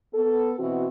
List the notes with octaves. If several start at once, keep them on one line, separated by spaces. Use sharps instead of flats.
B3 A4
B2 E3 C4 F#4